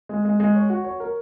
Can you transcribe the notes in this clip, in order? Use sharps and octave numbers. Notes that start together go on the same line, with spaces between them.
G#3
G#3
G#3
C#5
F#4
C#5
A#4